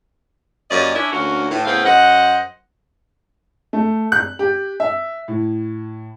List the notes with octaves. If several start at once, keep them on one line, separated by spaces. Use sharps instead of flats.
F#2 A#3 C#4 G4 D5 D#5
C#4 D4 E4
D2 D3 A#3 C#4 F#4 A#4
A2 E3
A2 C#3 B3 C4 F5
F#2 C5 D#5 F#5
A3
F#6
G4
E5
A2